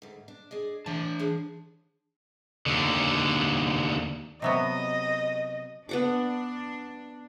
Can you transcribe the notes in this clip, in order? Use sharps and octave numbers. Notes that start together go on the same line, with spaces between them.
D2 G#2
D4
G#4 D5 D#5
E3 D4 A5
D4 G#4 C5
D#2 D3
C3 F#3 B3 D#5
B3 D4 F#5 D6